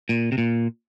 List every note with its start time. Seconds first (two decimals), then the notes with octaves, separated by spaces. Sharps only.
0.09 A#2
0.32 C3
0.38 A#2